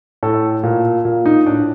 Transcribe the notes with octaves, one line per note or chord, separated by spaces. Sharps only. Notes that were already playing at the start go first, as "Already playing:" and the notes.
A2 A4
A#2
A#2
D#4
A2 D4